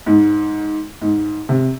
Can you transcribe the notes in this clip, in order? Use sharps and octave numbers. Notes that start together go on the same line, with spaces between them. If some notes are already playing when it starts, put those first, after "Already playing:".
G#2
G#2
C3